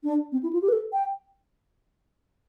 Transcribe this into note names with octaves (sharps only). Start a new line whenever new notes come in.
D4
C4
E4
F4
G4
B4
A4
G5